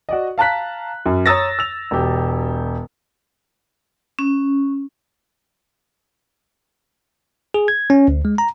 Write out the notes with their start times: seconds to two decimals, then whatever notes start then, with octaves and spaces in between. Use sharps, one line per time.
0.09 F#4 D5 D#5
0.38 F5 A5 A#5 F#6 B6
1.06 F#2
1.26 C#5 A#5 D#6 E6 A6 A#6
1.59 E6 F7
1.91 E1 G4
4.19 C#4
7.54 G#4
7.68 G#6
7.90 C#4
8.08 D2
8.25 G#3
8.38 A#5